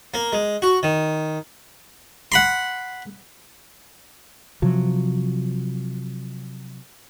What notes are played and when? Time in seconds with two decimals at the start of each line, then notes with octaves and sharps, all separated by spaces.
0.14 A#3
0.33 G#3
0.62 F#4
0.83 D#3
2.32 F#5 B5 C6
4.62 C3 F3 F#3